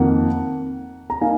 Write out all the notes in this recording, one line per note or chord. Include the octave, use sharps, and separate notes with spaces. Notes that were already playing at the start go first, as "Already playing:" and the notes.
Already playing: F2 D#3 A#3 F#5
A#5
A#3 D#4 F5 G#5